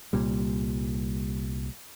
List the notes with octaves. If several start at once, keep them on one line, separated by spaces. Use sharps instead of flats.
C2 A#2 G3